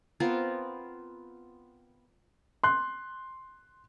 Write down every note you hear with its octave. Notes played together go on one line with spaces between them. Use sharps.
B3 C4 F4 A#4
C6 F#6